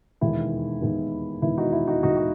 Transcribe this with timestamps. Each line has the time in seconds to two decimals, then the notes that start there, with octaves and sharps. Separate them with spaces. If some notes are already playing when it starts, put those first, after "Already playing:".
0.21 E1 D#2 D#3 G#3 B3 E4
0.82 E1 D#2 D#3 G#3 B3
1.42 E1 D#2 D#3 G#3 B3 E4
1.57 D#4 F#4
1.73 E4
1.87 D#4 F#4
2.03 E1 D#2 D#3 G#3 B3 D#4 F#4
2.16 F#4